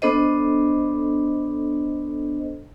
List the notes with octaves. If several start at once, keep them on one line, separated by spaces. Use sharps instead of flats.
B3 D4 A4 C5 D#5